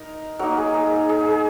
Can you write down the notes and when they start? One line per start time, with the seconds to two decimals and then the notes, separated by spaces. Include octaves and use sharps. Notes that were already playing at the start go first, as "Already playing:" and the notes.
Already playing: D#4 A#4
0.39 F#3 A#3 D#4 A#4
0.57 G#4
0.74 G#4
0.91 A#4
1.09 G#4
1.26 G#4